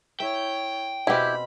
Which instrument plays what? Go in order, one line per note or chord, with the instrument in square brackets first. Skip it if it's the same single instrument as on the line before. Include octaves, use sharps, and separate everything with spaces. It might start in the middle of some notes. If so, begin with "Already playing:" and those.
[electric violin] E4 C#5 [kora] E5 [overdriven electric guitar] G5
[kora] B2 C4 C#4 [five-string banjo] E4 G4 [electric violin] B5